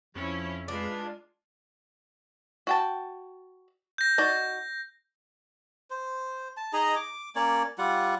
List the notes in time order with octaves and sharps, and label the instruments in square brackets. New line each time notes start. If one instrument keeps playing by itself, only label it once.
[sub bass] F2 [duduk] F3 [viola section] C#4 E4 C#5
[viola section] G#3 F4 [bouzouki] D4 [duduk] B4
[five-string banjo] F#4 G5 A5
[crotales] G6 A#6
[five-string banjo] D#4 F#4 D5
[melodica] C5
A5
D#4 G#4 D#5 A#5
D6
A#3 C#4 C#5 D5
G3 F4 F#5